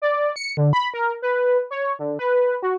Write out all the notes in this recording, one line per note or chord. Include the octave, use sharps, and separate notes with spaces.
D5
C#7
D3
B5
A#4
B4
C#5
D3
B4
F#4